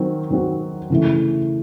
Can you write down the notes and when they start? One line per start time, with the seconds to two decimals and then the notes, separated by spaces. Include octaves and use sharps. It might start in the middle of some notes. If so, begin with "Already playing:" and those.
Already playing: D#3 F#3 C4
0.30 D#3 F#3 C4 F#4
0.90 C#3 E3 A3